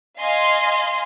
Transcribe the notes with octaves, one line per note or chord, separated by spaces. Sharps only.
D#5 F5 G#5 C6